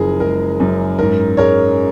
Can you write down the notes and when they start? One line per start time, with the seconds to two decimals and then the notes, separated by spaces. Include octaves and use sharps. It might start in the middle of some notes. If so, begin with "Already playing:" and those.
Already playing: F#1 F3 G#4 A#4
0.20 G#3 A#4
0.60 F#2
0.99 G#2 A#4
1.37 G#3 A#4 C#5